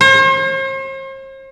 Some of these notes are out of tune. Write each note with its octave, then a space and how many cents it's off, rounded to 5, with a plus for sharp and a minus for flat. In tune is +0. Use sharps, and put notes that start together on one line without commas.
C5 +45